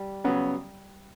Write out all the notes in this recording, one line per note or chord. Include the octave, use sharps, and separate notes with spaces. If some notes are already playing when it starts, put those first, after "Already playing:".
Already playing: G3
C#3 F#3 B3